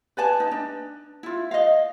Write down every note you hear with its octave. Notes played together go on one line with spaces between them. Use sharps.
B4 D5 G#5 A5
D#4
D4
E4 F4
D#5 F5